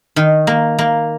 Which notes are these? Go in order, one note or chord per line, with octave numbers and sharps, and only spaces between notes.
D#3
A#3
A#3